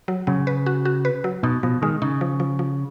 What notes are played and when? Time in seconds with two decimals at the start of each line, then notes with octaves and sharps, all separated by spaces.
0.08 F#3
0.27 C#3 F#3
0.47 B4
0.66 F#4
0.85 F#4
1.05 B4
1.24 F#3
1.43 B2 D#4
1.63 B2 F3
1.82 D#3 G#3
2.02 C#3 D#4
2.21 F3
2.40 F3
2.59 F3